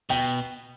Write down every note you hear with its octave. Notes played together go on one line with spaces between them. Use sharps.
B2 G5